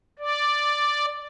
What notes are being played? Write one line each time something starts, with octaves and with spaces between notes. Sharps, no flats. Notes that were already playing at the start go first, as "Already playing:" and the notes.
D5